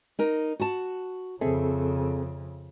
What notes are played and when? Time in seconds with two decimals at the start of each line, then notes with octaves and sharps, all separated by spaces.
0.19 D#4 A#4
0.60 F#4 A5
1.41 F2 C#3 C4 G#4 A4 E5